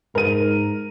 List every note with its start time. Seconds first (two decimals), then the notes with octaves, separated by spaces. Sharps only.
0.15 G#2 A#4 D#7